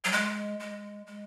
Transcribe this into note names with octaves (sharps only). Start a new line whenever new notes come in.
F#3
G#3
G#3
G#3